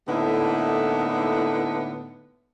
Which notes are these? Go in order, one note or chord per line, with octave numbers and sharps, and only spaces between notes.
A2 D3 A#3 B3 D#4 E4